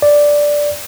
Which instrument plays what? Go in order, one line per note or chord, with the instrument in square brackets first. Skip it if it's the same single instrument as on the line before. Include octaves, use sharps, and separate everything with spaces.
[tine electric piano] D5